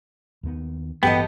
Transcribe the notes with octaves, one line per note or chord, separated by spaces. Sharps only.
D#2 D#3 B3
A1 G2 E3 B3 G4 A4 D#5 G5